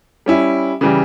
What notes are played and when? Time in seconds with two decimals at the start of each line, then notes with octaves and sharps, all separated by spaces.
0.26 G3 C#4 E4
0.81 C#3 E3 G3